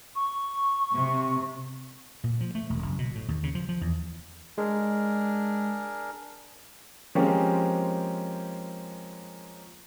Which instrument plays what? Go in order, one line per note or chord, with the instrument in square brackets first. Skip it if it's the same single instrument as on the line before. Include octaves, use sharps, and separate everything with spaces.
[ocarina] C#6
[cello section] C3
[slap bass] A#2
F3
A3
E1
F#1
B2
A2
D#2
C#3
F3
F3
E2
[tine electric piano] G#3 [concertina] D4 G#4 A#4
[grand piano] F3 G#3 A#3 C4 C#4 G4